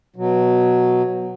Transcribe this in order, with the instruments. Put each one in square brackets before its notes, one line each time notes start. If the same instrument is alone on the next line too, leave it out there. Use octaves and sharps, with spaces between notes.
[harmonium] B2 F#3